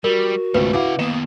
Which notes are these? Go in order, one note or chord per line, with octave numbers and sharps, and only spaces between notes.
G3 F#4 A#4
G#1 C#2 G3 A3 B4
C#3 E4 F5 F#5 D6
D#3 A#3 B3 D#5 E7